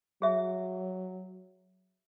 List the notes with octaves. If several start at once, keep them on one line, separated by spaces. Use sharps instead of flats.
F#3 G#4 E5